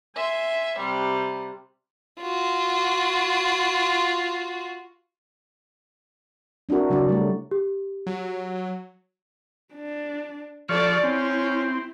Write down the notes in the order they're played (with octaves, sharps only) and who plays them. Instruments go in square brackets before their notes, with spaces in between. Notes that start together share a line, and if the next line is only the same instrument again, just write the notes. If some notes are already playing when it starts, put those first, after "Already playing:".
[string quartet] E5 G#5 C6
C3 G3
[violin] F4 F#4
[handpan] C4 D4 E4 F#4 A#4
C#3 F#3 C#4 D4 D5
G3 A3
[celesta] G4
[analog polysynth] F#3
[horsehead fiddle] D4
[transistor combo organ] F3 C#6 F6 [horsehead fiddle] A4 D5
[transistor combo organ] C4 [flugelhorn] C#4 [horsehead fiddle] E4